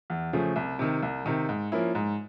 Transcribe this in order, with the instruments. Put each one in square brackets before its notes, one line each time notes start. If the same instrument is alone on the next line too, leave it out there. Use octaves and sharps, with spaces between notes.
[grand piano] E2
C#3 F3 A3
C2
C3 D#3
C2
C3 D#3
G#2
F3 A#3 C#4 E4
G#2